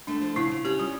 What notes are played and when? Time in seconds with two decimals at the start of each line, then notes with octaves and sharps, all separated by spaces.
0.07 A3 D4
0.22 F3
0.36 C#3 E4
0.51 C#3
0.65 C#4 G4
0.79 G3 F4